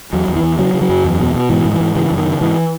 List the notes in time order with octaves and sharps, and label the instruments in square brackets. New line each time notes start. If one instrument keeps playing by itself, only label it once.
[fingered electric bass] E2 F#3
E2
E3
E2
C#3 F#3
C#3
F#3
F#2
E2
B2
B2
G#2 E3
G#2
E3
G#2
C#3 E3
F#2
D#3
C#3
G#2 E3